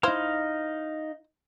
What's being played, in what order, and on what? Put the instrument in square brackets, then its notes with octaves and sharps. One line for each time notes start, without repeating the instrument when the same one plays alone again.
[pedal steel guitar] D#4 F5 [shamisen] E4 C5